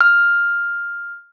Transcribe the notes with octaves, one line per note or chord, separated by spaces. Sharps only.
F6